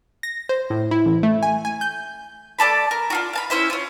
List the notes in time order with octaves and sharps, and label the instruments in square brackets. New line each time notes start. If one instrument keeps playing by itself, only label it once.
[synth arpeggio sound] A#6
C5
A2
E4
A1
A3
G#5
G#5
G6
[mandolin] A3 D5 A5 B5
A#4
D4 F4 F#4
F5 A5 B5
C#4 E4 C5 E5
C#4 F4